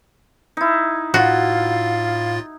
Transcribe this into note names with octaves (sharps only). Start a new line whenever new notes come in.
D#4 E4
A2 F4 F#4 F5 A6